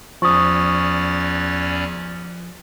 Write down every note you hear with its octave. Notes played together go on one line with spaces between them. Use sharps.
E2 F3 C#4 D5 C#6 D#6